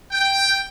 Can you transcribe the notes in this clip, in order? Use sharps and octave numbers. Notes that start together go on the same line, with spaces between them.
G5